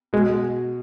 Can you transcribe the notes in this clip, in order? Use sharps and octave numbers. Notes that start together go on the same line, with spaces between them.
B2 G#3